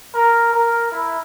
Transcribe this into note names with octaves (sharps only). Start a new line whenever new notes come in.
A#4
A#4
E4